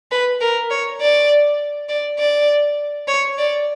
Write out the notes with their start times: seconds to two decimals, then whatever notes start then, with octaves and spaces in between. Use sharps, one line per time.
0.11 B4
0.41 A#4
0.70 C#5
1.01 D5
1.89 D5
2.19 D5
3.08 C#5
3.38 D5